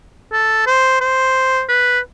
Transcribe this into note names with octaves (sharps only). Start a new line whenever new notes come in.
A4
C5
C5
B4